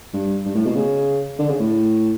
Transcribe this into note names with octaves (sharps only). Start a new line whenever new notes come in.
G2
G2
A2
B2
C#3
D3
C#3
A2